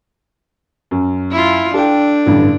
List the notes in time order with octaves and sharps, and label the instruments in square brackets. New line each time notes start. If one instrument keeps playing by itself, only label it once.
[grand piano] F#2
[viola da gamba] E4 F4
[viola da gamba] D4 [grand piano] A4 G5
[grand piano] A1 G2 D3